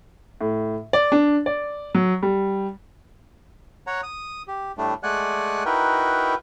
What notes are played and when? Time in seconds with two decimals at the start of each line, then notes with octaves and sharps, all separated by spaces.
0.41 A2
0.93 D5
1.12 D4
1.46 D5
1.94 F#3
2.23 G3
3.87 C#5 F#5 A#5
4.03 D#6
4.48 G4
4.78 A2 G3 A3 D4
5.03 G#3 A3 D5 F#5 G#5 F#6
5.65 D#4 E4 F#4 A#4 B4 G5